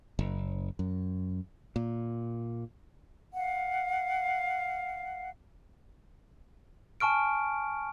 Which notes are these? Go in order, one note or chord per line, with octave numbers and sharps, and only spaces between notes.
F#1
F#2
A#2
F5 F#5
G#5 A5 C#6 F6 D7